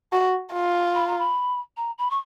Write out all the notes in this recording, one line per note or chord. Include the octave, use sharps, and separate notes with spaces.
F#4
F4
B5
A#5
B5
A#5
B5
C#6